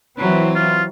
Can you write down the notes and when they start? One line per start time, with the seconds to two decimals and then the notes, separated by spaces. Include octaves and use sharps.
0.18 E3 F#3 C4 B4
0.55 F4